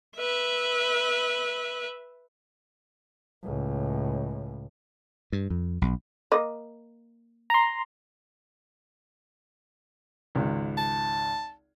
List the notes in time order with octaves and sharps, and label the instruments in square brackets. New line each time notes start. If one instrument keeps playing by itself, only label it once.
[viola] B4 E5
[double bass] C#2 A2
[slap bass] G2
F2
B1
[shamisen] A#3 D#5
[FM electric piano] A#5 C6
[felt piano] G#1 C#2
[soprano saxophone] A5